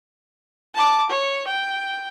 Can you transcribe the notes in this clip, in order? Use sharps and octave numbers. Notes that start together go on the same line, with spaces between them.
A5 D6
C#5
G5